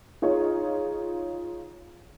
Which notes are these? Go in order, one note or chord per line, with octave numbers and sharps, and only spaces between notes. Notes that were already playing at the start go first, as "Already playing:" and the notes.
D#4 F4 G#4 C#5